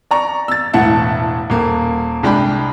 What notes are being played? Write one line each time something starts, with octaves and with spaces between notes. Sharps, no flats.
D5 A#5 C#6
E6 A6
E1 A2 E3 E4 F#5 A5
D#1 A#3
C2 G#3 D4 G5 B5